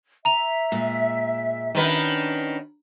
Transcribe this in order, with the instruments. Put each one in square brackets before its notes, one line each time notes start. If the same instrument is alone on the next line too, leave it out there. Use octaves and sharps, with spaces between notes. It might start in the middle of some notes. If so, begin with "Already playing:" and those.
[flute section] E5 [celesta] A#5 F7
[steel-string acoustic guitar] A#2 G#3
[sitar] D#3 B4 [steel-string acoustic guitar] C#4 D4 F#4